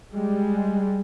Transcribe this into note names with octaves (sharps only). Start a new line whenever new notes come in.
G3 G#3